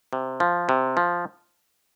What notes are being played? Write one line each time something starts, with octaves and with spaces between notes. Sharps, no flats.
C3
F3
C3
F3